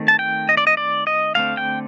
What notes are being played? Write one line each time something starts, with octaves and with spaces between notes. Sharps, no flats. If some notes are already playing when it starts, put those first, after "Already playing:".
Already playing: D#3 A3 C4
A5
G5
D#5
D5
D#5
D5
D#5
D3 A3 C4 F5
G5